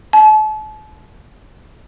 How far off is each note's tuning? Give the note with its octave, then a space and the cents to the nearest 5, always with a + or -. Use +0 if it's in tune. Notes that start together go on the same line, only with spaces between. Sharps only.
A5 -40